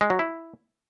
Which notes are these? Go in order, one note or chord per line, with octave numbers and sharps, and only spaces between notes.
G#3
F#3
E4